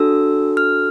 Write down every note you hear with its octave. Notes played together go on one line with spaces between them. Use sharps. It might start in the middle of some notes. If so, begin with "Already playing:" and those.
Already playing: D4 F#4 A4 E6
F6